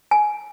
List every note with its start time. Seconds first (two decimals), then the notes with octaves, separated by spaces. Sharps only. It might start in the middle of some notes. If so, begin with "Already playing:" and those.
0.11 G#5